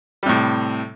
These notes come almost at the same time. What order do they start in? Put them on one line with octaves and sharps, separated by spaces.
G3 C3 A2